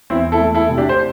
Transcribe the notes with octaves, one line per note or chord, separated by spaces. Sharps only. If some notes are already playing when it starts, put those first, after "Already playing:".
E2 C4 E4
E4 A4
A3
E4 A4
C3
D4 G4
C5